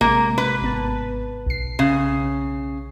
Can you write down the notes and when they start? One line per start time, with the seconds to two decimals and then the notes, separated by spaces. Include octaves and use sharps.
0.01 A1 C3 G#3 A#3
0.38 B4
0.62 G#1 B3 A5
1.46 B1 C7
1.79 C#3